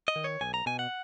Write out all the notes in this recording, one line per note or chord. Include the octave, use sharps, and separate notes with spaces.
D#5
D#3
C#5
B1 G#5
A#5
B2 G#5
F#5